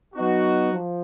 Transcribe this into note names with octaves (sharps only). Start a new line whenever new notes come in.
F#3 B3 D#4 F#4
F3